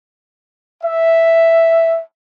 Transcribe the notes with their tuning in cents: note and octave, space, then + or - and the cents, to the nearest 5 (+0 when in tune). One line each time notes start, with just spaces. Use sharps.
E5 +0